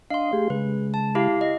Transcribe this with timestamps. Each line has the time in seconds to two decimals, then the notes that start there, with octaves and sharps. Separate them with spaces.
0.10 D4 D#5 F5 C6
0.33 A3 G4 G#4
0.50 C#3 G#3 B4
0.94 A5
1.15 E4 G4 F5
1.41 D#5